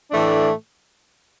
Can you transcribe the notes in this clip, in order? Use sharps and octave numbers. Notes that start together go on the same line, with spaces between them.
A2 E3 A3 D4